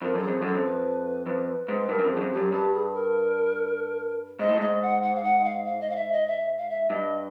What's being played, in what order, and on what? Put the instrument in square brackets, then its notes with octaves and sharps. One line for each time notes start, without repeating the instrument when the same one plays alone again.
[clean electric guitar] F2 [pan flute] A#4
[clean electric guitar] F#2 [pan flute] A4
[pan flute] G#4
[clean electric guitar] F2
[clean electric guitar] F#2 [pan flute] A4
[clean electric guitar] F2
[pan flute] B4
[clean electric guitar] F2
G#2
[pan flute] B4
[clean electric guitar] G2 [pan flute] A#4
[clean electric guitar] F#2
F2
[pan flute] G#4
[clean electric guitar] F#2
F2
[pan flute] G4
[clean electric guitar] F#2
[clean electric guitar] G2 [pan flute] G4
[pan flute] G#4
A#4
[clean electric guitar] G#2 [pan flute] D#5
[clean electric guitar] A2
[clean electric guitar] G#2 [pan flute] D#5
[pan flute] F#5
F#5
F5
F#5
F5
F5
D#5
F5
E5
D#5
E5
F5
E5
[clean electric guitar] G2 [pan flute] D#5